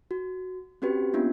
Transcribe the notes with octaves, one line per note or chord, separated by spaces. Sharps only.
F#4
C4 C#4 F#4 G4 B4
A#3 B3 C#4 D4 F4